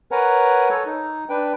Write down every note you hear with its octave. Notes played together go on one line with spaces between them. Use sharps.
A#4 B4 C#5 F#5 G#5 A#5
A4 C#5
D#4
D4 B4 G5